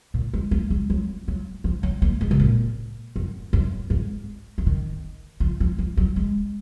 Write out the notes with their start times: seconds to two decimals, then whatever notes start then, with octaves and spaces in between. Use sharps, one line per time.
0.14 A#2
0.33 G#3
0.51 A#3
0.70 G#3
0.90 F#3
1.28 F#3
1.64 F3
1.83 F#3
2.02 A#3
2.21 G#3
2.31 C3
2.40 A#2
3.16 F#2
3.53 F#2
3.90 G#2
4.58 F3
4.66 D#3
5.40 F3
5.60 F3
5.78 F3
5.97 F#3
6.16 G#3